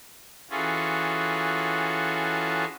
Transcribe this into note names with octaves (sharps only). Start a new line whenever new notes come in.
E3 C#4 F4 F#4 G#4 A4